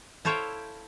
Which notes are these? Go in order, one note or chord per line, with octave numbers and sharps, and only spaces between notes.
E4 A4 C5 C#5 F5 G5